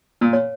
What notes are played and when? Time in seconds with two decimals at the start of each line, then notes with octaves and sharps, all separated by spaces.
0.21 A#2
0.33 C#5